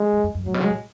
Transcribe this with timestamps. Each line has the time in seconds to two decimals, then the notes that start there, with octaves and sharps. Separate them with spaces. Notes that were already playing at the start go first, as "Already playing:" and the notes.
Already playing: G#3
0.13 F#2
0.24 F#2
0.35 F#2
0.46 A2 F#3
0.54 B2
0.63 G#3
0.70 A2